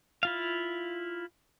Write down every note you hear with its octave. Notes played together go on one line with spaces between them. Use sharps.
E4 F4 F5